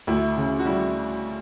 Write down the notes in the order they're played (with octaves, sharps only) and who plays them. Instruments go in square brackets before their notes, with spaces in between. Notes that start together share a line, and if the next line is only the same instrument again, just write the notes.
[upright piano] D2 [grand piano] E4
[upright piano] C#3
[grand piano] F#4
[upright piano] G3 [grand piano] E4